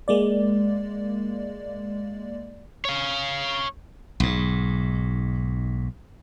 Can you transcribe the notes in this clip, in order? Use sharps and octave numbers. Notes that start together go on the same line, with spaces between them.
G#3 A#3 D5
C#5 F5
B1 G#2